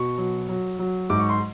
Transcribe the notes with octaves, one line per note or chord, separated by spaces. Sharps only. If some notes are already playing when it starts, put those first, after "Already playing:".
Already playing: B2 C#6
F#3
F#3
F#3
G#2 D6
C#6
C6